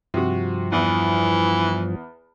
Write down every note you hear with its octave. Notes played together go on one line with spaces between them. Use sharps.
G2 C3 F3 F#4
E2 E3